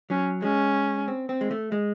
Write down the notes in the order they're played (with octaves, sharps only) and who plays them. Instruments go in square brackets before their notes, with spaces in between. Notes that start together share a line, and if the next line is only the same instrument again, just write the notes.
[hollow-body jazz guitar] F#3 [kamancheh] C#4
[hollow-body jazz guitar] G#3 [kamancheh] C#4
[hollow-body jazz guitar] C4
C4
G#3
A3
G#3